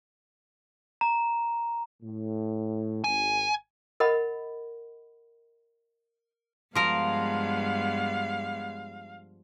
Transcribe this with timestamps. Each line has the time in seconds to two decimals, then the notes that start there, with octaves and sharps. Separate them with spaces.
1.01 A#5
2.02 A2
3.04 G#1 G#5
4.00 A#4 D#5 F#5 B5
6.75 G2 F3 G#3 B3 A#4 F5